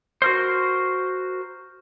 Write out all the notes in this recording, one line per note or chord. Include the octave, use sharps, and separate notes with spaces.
F#4 A#4 C5